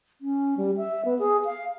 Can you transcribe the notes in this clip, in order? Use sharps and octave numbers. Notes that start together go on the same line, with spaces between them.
C#4
G3
E5
B3
G#4
F5